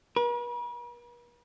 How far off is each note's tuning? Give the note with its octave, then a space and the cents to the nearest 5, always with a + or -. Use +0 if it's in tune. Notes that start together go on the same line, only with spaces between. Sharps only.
B4 -45